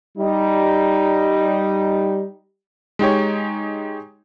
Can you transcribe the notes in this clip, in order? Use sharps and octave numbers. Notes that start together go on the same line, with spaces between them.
G3 D#4
G#3 D#4 G4 C#5